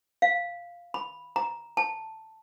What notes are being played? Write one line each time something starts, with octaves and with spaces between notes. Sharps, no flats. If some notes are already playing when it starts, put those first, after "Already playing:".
F5
B5
A#5
A5